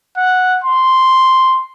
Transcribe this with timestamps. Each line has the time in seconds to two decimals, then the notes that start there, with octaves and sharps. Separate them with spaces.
0.17 F#5
0.64 C6